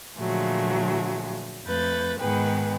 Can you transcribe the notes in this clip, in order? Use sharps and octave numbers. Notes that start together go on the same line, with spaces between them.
A#2 D3 F3 F#3 G#3 A3
F2 A3 B4 G6 A6
G#2 D#3 B3 G#4 B4 G5